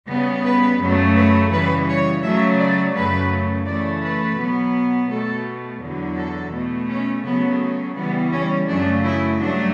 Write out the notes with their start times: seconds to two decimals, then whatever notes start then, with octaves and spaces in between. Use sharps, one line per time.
0.09 C#3 G3 B3
0.45 B4
0.80 F#2 C#3 F#3 A3
1.16 B4
1.52 C#3 E3 G3 B4
1.89 C#5
2.23 C#3 F#3 A3 E5
2.60 D5
2.96 F#2 C#3 F#3 A3 B4
3.66 C#3 E3 A3 D5
4.03 B4
4.38 B2 F#3 B3
5.10 B2 A3 A4
5.82 E2 D3 F#3
6.17 A4
6.53 B2 A3
6.89 C#4
7.24 C#3 F#3 A3 B3
7.96 C#3 E3 G3 B3
8.33 C#4
8.68 F#2 C#3 F#3 A3 D4
9.04 E4
9.39 G2 F#3 A3 D4